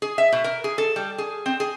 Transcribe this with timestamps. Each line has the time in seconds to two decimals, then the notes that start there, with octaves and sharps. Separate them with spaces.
0.02 G#4
0.18 E5
0.32 B2
0.44 A#4
0.64 G#4
0.78 A4
0.96 G3
1.18 G#4
1.46 C4
1.60 G#4